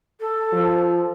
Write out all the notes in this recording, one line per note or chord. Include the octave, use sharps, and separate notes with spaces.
A4
F3